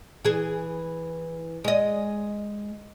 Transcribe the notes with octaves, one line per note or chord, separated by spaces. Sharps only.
E3 G#4
G#3 D#5